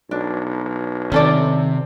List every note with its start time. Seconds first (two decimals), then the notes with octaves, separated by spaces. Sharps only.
0.11 B1 D4
1.12 C3 D#3 C#4 A4 D5